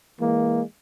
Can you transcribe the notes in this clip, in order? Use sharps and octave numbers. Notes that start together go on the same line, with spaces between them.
E3 G#3 A#3